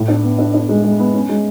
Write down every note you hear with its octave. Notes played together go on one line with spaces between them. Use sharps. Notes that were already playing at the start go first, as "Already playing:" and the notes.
Already playing: A2
D4
B3
D4
D4
G#3
G#3
B3
C#4
G#3